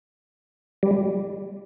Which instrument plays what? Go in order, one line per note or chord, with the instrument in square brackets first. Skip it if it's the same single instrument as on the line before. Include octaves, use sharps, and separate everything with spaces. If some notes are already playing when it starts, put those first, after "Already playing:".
[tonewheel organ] G3